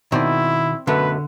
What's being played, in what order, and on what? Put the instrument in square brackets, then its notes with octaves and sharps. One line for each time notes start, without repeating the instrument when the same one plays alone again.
[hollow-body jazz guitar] B2 D#3 [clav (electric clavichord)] C4 C5 D5 [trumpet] E4
[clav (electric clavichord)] F#2 B2 A3 [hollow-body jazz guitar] D3 [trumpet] B4